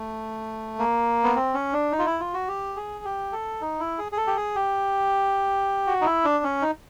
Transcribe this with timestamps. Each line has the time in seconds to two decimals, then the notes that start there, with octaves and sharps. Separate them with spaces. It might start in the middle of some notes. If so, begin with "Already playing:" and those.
Already playing: A3
0.79 A#3
1.24 B3
1.36 C4
1.54 C#4
1.73 D4
1.92 D#4
1.99 F4
2.06 E4
2.20 F4
2.34 F#4
2.48 G4
2.76 G#4
3.05 G4
3.32 A4
3.61 D#4
3.80 E4
3.98 G#4
4.12 G#4
4.17 A4
4.27 G4
4.36 G#4
4.56 G4
5.87 F#4
6.01 D#4
6.06 E4
6.25 D4
6.44 C#4
6.62 D#4